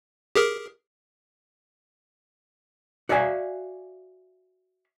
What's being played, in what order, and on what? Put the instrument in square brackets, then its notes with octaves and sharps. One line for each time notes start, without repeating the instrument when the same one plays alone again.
[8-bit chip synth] G4 G#4 A#4
[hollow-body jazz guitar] F#4 D5 E5 F5 G#5